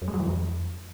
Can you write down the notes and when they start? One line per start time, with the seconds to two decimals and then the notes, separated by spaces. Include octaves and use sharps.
0.02 F#2
0.08 G#3
0.14 F#3
0.20 E3
0.26 F2